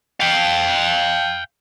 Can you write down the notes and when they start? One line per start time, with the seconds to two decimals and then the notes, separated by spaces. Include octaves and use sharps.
0.20 F5 G5